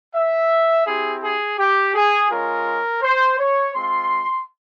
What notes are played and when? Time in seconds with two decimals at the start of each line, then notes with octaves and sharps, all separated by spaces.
0.15 E5
0.87 C4 E4 G4 G#4
1.23 G#4
1.59 G4
1.94 G#4
2.30 G#3 C#4 F4 A#4
3.02 C5
3.39 C#5
3.75 G#3 C4 F4 C6